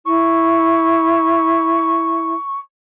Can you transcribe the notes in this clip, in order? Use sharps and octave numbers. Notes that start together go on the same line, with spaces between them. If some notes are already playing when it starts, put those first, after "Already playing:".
E4 C#6